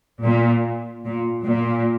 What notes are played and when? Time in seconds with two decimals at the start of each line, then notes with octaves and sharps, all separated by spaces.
0.24 A#2
1.05 A#2
1.45 A#2